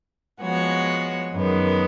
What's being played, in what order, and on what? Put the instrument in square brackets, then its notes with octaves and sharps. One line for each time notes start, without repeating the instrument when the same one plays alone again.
[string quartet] F3 G#3 B3 F#4 C#5
F#2 D#3 G#3 B3